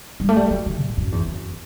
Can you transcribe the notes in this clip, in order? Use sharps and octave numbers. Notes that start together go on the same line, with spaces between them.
G3
A3
G3
F#3
D#3
A2
F#2
E2
F#2